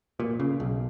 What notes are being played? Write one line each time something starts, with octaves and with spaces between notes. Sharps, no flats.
A#2
C#3
B1